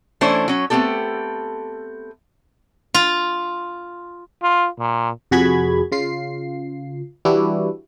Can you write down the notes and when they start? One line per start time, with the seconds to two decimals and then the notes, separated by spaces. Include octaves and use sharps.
0.21 E3 A3 C#4 D4 E4 C5
0.48 F#3 C#4
0.70 A3 B3 C4 G4 A4
2.94 F4
4.43 F4
4.79 A#2
5.31 F2 C3 F#4 G#4 B5 G#6
5.92 C#3 F4 C7
7.25 E3 G3 D4 E4 F#4 G4